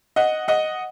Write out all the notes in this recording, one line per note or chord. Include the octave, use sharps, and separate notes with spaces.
D#5 F#5
D#5 F#5